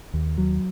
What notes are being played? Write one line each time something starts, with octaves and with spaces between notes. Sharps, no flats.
D#2
F#3